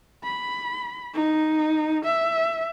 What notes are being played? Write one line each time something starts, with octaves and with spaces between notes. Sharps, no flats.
B5
D#4
E5